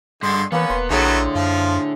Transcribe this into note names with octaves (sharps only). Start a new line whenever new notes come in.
G2 D3 G#3 C6
E3 A#3 B3 C#4 B4
E1 C6
A#1 A2 D3 F#3 A3 B3 G#4
F#2 F3 F4